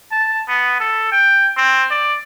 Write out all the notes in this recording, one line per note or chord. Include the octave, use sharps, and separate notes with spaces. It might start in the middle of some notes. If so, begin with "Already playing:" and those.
A5
B3
A4
G5
C4
D5